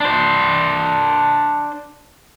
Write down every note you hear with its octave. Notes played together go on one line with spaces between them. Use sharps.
D4 C5